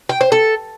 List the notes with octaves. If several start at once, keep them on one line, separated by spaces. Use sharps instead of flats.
G5
C5
A4